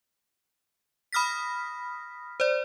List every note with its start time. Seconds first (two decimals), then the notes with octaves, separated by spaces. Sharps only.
1.13 B5 D#6 F6 A#6 B6
2.40 C5 D5